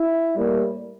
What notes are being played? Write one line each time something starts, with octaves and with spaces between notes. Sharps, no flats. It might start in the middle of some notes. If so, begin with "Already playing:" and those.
Already playing: E4
A2 G3 A#3